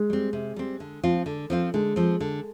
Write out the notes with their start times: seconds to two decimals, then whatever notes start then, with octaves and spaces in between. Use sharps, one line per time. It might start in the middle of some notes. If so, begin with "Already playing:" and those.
Already playing: G#3
0.10 G3 C4
0.33 C3
0.56 G3 C4
0.80 D3
1.03 F3 C4 F4
1.26 D3
1.50 F3 C4 F4
1.74 D3 G#3
1.96 F3 C4
2.20 D3